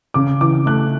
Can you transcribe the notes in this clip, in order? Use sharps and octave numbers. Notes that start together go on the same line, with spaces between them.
C#3 D6
E3 D6
A3 F#6